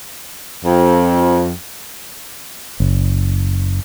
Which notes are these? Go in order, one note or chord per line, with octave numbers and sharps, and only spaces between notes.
F2
F#1